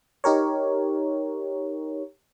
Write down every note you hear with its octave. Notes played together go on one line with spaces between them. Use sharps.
D#4 G4 A#4 C#5